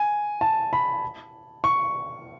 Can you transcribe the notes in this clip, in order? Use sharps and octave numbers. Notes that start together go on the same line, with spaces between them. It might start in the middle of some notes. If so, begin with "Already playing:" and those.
Already playing: G#5
A5
B5
C#6